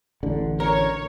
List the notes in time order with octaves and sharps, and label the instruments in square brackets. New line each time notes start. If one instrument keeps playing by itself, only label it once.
[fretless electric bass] A1 D3
[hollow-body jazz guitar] A#4 [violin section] C#5